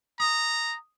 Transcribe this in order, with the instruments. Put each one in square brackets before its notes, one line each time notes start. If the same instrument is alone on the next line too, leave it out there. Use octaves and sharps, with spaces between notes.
[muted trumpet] A#5 [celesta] D#6